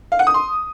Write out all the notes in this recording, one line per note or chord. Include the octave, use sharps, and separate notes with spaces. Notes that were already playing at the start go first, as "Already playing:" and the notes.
F5
F#5
D#6
C6